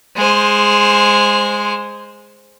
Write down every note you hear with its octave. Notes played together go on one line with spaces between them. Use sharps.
G#3 C5